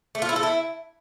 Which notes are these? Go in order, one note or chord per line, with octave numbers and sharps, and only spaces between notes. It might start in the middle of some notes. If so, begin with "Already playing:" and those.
A3
F4
E4
A4
E4